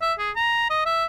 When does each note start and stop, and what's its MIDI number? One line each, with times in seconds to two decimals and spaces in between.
0.01 0.13 76
0.19 0.31 68
0.36 0.69 82
0.70 0.84 75
0.86 1.05 76